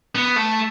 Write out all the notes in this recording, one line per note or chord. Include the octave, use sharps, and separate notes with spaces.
B3
A3